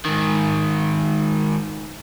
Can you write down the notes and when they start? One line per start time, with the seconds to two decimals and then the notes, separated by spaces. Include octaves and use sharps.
0.05 G#2 D#3